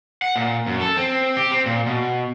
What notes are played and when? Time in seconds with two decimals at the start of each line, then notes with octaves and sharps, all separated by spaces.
0.22 F#5
0.36 A#2
0.67 F#2
0.81 A4
0.97 C4
1.37 G4
1.51 C4
1.66 A#2
1.86 B2